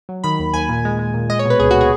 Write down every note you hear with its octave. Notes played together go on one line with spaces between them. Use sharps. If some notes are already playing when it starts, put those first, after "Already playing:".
F#3
D#3 B5
D#2
D#2 G#5
A#2
G#3
G#3
A#2
G#3 D#5
C#5
B2
B4
C#2 G#4
F#4
G#4